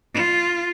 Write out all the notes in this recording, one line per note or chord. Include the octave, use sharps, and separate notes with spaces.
F4